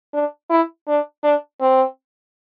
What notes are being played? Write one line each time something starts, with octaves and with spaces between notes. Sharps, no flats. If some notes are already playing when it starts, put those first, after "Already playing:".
D4
E4
D4
D4
C4